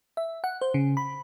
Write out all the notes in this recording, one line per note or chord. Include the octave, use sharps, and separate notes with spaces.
E5
F#5
C5
C#3
B5